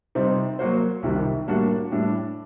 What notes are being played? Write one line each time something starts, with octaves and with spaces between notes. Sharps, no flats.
C3 G3 C4 D#4
F#3 A#3 F#4 C5
C2 C3 D#3 G3
A2 G3 A#3 D4 F#4
A2 G3 D4